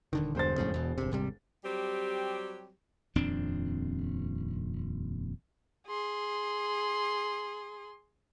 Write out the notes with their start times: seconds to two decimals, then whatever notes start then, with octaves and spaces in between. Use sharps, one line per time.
0.13 D#1 D3 D#3
0.35 E1 G2 D3 C5 A6
0.58 F2 A2 C#3
0.74 E2 B2
0.98 G1 C3
1.11 G#1 C3 G3
1.64 F#3 G3 C4 G4
3.15 D#1 F2 C4 D4
5.87 G#4 C6